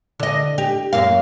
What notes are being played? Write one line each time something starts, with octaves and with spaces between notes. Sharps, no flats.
D3 D#5
G4
F#2 A#3 F5